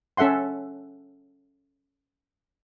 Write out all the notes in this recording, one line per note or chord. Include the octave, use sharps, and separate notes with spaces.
C#4 A4 E5 F#5 C6